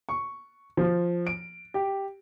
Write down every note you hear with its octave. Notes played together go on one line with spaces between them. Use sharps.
C#6
F3
D7
G4